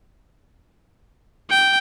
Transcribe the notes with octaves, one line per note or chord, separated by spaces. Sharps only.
G5